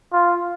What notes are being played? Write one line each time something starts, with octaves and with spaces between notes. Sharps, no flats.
F4